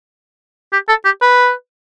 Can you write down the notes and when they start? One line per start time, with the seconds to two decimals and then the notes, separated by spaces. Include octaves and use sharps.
0.73 G4
0.89 A4
1.05 G4
1.22 B4